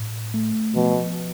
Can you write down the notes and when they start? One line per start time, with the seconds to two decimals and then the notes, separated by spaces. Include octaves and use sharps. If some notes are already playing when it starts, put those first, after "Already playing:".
Already playing: A2
0.34 A3
0.75 B2 F3